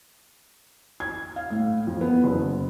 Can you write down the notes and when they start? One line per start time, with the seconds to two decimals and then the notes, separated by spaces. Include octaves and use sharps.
1.00 G#6
1.36 F5
1.50 A2
1.87 F2
2.01 B3
2.23 F#1